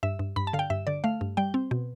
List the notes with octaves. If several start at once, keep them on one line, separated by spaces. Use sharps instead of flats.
G2 E5
G2
G2 B5
A5
D3 F5
G5
G2 E5
D3 D5
A3 F5
G2
G3 G5
C4
B2